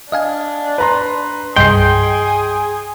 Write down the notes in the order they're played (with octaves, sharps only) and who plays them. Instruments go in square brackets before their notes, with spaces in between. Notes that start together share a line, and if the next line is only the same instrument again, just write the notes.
[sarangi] D4 [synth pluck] D#5 F5 G#5
[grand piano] B4 A#5 C6
[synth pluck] C2 G2 D#5 [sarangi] G#4 [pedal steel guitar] G5 [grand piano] C6 C7